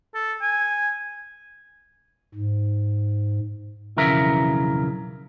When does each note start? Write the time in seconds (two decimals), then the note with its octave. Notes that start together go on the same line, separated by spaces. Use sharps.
0.15 A4
0.42 G#5
2.35 G#2
3.97 B1 F2 C#3 E3 A#4 E5